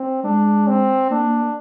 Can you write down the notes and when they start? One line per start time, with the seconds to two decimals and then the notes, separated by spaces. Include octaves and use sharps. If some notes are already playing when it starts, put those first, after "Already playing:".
Already playing: C4
0.24 G#3 D4
0.67 C4
1.10 A#3 D4